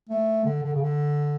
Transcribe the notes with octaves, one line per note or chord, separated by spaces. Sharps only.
A3
D3
D3
C#3
D3